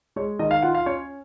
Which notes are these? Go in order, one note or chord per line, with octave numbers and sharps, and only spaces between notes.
G#3 C#5
D#3 D#5
F5
F4 F#5
F5
C#4 C#5